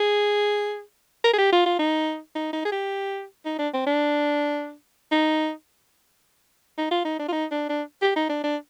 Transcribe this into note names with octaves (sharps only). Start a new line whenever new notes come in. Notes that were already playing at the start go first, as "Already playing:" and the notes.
Already playing: G#4
A#4
G#4
G4
F4
F4
D#4
D#4
D#4
G#4
G4
D#4
D4
C4
D4
D#4
D#4
F4
D#4
D4
F4
D#4
D4
D4
G4
D#4
D4
D4